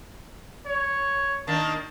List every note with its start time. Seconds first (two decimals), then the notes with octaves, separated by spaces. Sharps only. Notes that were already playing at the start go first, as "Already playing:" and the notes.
0.66 C#5
1.47 D#3 A#3 D4 A5